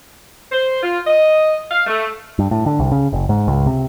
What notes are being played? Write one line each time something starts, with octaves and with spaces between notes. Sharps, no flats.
C5
F4
D#5
F5
A3
G2
A2
D3
C2
C#3
F#1
G#2
C#2
C3